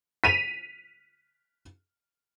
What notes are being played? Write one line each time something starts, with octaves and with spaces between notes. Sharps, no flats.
B6 D#7 F7